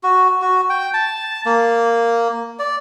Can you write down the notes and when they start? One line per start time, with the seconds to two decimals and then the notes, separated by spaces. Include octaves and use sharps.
0.03 F#4
0.42 F#4
0.70 G5
0.94 A5
1.45 A#3
2.59 D5